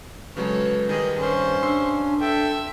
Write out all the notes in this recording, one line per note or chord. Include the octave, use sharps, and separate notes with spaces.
C#3 F#3 G#3 A4 B4 C#5
D#3 G3 G#4 D#5
G2 C#4 C5 C#6
D4 C6 E6 C7
A4 E5 G5